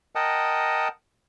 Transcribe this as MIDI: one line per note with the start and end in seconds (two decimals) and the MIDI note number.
0.15 0.88 70
0.15 0.88 75
0.15 0.88 78
0.15 0.88 79
0.15 0.88 81
0.15 0.88 87